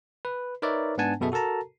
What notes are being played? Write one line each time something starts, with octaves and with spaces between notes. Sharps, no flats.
B4
D#4 A#4 B4 C#5 D5 E5
G#2 B3 D4 F#5 G#5 A5
F#2 B2 G#4 A4 E5
F#4 A4 A#4 A5 A#5